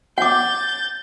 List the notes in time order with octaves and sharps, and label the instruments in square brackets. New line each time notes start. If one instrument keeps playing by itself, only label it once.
[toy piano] F#5 D6 [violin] G6 A6